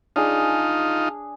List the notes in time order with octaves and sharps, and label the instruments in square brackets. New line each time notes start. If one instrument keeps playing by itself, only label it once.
[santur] D4 G#4 [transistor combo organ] D#4 F4